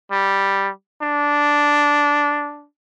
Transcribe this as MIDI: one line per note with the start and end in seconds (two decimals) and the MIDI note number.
0.12 0.70 55
1.02 2.66 62